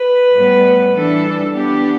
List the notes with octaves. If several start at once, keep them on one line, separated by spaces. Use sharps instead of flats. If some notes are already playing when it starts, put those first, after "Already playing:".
Already playing: B4
A2 G3 B3
E3 G3 D4 A4
E3 B3 D4 G4